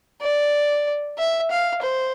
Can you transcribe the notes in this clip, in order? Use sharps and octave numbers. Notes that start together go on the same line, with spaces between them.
D5
E5
F5
C5